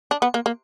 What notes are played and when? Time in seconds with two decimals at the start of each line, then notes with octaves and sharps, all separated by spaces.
0.11 D4
0.22 B3
0.34 A#3
0.46 A#3